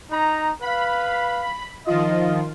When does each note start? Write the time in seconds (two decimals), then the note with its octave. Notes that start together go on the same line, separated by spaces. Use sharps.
0.12 D#4 A#5
0.62 B4 F5 B5
1.87 D#3 F3 F4 D#5